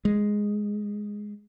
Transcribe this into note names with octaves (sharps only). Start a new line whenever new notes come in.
G#3